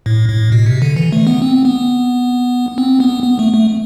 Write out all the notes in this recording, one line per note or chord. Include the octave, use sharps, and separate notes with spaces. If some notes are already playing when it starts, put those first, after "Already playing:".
A2
A2
B2
C3
D3
E3
A3
B3
C4
B3
C4
B3
B3
A3
A3